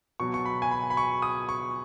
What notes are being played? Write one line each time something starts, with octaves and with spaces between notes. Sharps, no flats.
B2 F#3 C#6
C#6
B5
G#5
B5
B5
C#6
D#6
C#6